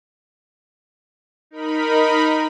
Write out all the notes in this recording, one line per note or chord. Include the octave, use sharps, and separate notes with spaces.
D#4 A#4 B5